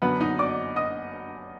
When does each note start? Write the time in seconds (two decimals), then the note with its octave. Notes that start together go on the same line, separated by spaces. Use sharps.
0.02 F#2 D3 F#3 B3 B4
0.20 D#4 D#5
0.39 D5 D6
0.76 D#5 D#6